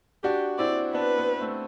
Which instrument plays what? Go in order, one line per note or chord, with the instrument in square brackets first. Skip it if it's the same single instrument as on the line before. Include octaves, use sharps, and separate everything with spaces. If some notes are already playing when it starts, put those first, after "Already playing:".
[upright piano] D4 F#4 [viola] G4
[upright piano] C4 E4 [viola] D5
[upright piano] B3 D4 [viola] B4
[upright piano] B3
A3 C4